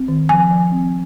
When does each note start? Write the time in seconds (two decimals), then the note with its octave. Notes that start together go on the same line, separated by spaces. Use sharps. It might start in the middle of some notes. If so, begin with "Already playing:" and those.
Already playing: C4
0.08 D#3
0.29 F3 G#5
0.51 F3
0.72 C4